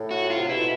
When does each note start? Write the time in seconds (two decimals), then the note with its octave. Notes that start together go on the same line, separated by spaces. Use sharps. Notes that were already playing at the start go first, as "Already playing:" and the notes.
Already playing: A2
0.11 F#4
0.30 F4
0.37 C3
0.49 B2 E4